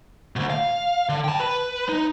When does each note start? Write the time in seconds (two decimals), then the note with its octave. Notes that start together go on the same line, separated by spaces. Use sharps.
0.36 D2 B2
0.50 F5
1.09 D3
1.24 G5 A5
1.40 B4
1.89 D#4